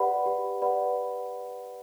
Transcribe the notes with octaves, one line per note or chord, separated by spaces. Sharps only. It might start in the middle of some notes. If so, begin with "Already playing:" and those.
Already playing: G4 B4 D5 F#5 B5
G4
B4 D5 F#5 B5